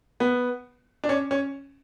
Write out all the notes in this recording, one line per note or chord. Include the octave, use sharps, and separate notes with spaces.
B3
D4
C#4
C#4